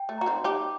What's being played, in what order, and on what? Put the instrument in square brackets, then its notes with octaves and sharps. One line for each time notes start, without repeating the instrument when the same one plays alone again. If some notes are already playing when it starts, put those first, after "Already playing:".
Already playing: [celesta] G5
[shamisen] A3
[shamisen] F#4 [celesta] A#5
[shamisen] C4 D#4
[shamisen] D#4 G4 [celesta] D6